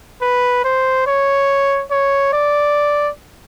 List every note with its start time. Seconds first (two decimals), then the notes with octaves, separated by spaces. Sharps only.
0.22 B4
0.65 C5
1.07 C#5
1.91 C#5
2.33 D5